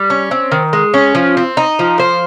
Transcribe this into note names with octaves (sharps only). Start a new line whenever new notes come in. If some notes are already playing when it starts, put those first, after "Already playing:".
Already playing: G3
C#4
C4
D#3
G#3
C#4
F3
C4
D#4
F3
C5